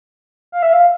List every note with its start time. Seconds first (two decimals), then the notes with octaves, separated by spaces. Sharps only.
0.52 F5
0.63 E5
0.73 F5